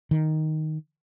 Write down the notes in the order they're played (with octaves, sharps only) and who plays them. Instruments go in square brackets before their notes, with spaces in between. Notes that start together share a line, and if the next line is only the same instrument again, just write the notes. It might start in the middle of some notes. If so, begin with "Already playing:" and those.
[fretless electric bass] D#3